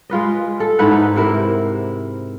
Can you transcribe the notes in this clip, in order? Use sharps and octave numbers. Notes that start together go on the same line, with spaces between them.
G#3 F4 B4 D#5
A4
G#2 E4 B4 F#5
D#4
C3 E4 A#4